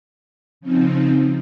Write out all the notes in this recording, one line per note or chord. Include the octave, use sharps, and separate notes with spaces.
C#3 F3 C4 D#4